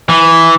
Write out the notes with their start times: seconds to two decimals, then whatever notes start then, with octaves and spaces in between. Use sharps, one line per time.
0.09 E3